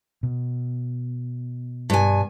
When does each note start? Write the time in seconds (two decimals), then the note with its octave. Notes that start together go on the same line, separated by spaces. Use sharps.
0.23 B2
1.90 G2 G#5